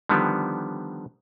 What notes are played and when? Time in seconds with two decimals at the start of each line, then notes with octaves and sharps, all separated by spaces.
0.09 D3 D#3 F3 G3 B3